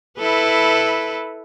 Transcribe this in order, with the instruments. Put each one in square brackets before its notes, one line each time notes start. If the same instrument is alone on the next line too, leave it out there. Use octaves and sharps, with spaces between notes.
[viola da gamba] E4 A4 B4